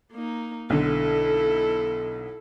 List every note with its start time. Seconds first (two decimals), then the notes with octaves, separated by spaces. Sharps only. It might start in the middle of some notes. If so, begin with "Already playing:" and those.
0.12 A#3 D#4
0.70 B1 D3 E4 A4